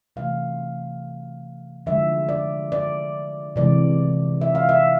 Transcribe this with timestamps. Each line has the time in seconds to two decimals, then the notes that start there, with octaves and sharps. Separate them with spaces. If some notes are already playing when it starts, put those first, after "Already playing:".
0.16 C3 E3 A3 F5
1.86 D3 F3 G#3 E5
2.29 D5
2.72 D5
3.56 C3 E3 G#3 D5
4.41 E5
4.55 F5
4.69 E5